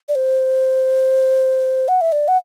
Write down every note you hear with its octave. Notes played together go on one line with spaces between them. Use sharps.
D5
C5
F#5
E5
D5
F#5